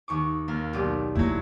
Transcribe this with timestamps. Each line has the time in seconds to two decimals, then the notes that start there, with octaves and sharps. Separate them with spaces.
0.08 D#2 C#6 D6
0.48 D#2 A#4
0.73 B1 G4 D5
1.15 D#1 G2 F#3 A3 E4